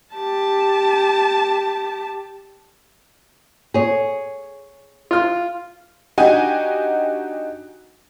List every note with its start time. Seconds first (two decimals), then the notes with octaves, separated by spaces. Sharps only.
0.15 G4 A5
3.74 G#4 C#5
5.11 F4 F6
6.18 D4 D#4 F#4 G4 D#5 G#5